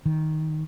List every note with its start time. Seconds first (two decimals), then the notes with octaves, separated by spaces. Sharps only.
0.06 D#3